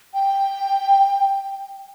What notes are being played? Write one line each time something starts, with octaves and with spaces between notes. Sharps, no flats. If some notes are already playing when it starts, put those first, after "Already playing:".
G5